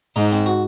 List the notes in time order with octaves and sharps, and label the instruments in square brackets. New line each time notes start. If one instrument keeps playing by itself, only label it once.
[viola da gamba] G#2 [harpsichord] D#4
[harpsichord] C4
F#4